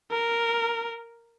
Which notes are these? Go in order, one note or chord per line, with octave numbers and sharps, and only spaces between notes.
A#4